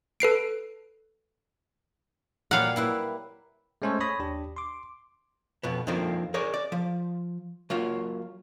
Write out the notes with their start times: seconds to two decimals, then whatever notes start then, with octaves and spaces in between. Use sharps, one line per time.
0.20 A4 B4 C7 D7
2.51 A#2 F#3 G3 F5 F#5
2.76 A#3 E4 B4
3.82 G#3 A3 C#4 A4 C5 C#5
4.00 C#5 B5 D#6 A#6
4.19 D#2 D4 G4
4.56 C6 D6
5.63 F2 B2 B3
5.87 F2 D3 D#3 F3 A#3 C4
6.34 G#4 A#4 C#5 D5
6.54 D5
6.72 F3
7.70 F#3 A#3 F4